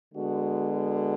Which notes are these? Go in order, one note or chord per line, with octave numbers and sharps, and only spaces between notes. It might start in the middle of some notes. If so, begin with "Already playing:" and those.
D3 G#3 B3 F#4
F#4